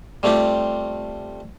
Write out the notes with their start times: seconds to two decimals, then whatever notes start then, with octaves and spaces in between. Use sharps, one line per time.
0.23 G3 A3 C4 F4 G4